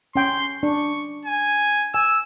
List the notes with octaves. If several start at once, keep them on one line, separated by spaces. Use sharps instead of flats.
C#4 G5 C6
D4 C#6
G#5
G#5 E6